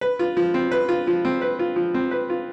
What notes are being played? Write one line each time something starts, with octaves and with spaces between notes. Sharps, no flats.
B4
F4
F3
C4
B4
F4
F3
C4
B4
F4
F3
C4
B4
F4